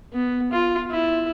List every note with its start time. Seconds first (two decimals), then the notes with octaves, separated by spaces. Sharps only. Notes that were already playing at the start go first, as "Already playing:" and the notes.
0.13 B3
0.52 F4
0.91 E4